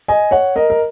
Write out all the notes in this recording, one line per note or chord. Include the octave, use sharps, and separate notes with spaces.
D#5 G#5
C#5 F#5
A#4 D#5
A#4